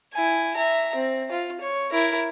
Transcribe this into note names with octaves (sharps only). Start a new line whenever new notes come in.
E4 G#5
E5 A#5
C4
F4
C#5
E4 A#4